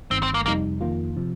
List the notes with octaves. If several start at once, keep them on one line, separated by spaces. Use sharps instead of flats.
G1 G2 D#3 C4
C4
A#3
F2 C3 G3 A#3 D#4
F2 D#3 A#3 F4
C3 F3